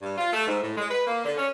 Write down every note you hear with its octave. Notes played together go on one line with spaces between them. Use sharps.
G2
F4
A3
G#2
A2
G#3
B4
A#3
D3
C#4